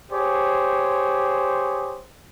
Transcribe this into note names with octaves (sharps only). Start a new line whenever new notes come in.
G4 G#4 C5 C#5